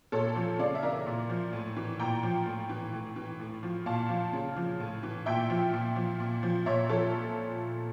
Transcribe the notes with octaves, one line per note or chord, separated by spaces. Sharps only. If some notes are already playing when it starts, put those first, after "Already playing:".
A#2 A4 C#5
F3
C#3 D5 F5
E5
E3 A#4 D5
A#2
F3
A2
E3
A#2 G5 A#5
F3
A2
E3
A2
E3
A2
F3
A#2 F5 A5
F3
C#3
F3
A2
E3
A#2 E5 G5
F3
A#2
F3
A#2
F3
A#2 C#5 E5
F3 A4 C#5